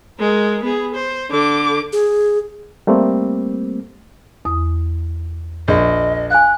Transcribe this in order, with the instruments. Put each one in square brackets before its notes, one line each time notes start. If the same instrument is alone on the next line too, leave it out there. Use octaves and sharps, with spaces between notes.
[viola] G#3 A#4
B3 G#4
C5
D3 D6
[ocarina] G#4
[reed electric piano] G3 A3 A#3 C4
[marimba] E2 D#6
[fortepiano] A#1 [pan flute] D#5
[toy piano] F5 G#5 [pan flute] F#6